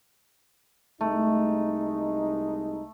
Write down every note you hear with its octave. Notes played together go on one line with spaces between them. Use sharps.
C2 G#3 A3 D#4